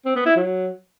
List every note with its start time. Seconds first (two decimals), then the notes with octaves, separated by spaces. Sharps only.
0.06 C4
0.16 B3
0.26 E4
0.36 F#3